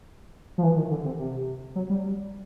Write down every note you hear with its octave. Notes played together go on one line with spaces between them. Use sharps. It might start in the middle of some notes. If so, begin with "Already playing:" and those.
F3
E3
D#3
D3
C3
C3
F#3
G3